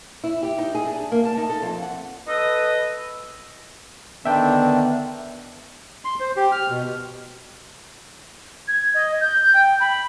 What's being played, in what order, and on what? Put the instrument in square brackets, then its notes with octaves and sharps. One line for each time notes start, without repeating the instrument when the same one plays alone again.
[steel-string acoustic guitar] E4
G4
D#4
G#4
D4
A#3
A5
D#4
A4
F2
F#5
[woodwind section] A4 B4 D#5
[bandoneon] D3 D#3 D4 [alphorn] B3 [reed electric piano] E5 G5
[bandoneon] C6
C5
G4
F6
B2
[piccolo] G#6
D#5
G6
G5
B5